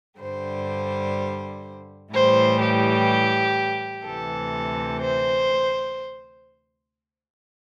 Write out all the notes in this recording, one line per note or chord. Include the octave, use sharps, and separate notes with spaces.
G2 D3 G3 C5
A2 E3 G3 C5
G4
D2 C3 E3 A4
C5